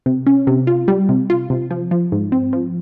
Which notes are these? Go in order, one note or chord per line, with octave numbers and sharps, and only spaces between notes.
C3
C#4
C3
F4
G3
C3
F4
C3
F3
F3
G#2
C4
F3